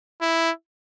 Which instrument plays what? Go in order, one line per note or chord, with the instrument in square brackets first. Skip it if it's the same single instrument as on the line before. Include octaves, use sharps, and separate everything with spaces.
[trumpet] E4